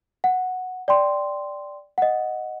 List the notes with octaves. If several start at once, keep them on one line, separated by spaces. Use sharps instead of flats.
F#5
D5 G5 C6
D#5 F#5